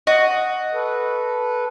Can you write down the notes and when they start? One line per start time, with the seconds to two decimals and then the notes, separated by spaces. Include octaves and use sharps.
0.07 F#4 D#5
0.74 A4 B4